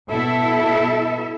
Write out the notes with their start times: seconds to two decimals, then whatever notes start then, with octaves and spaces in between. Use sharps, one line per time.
0.10 B2 E4 A4 E5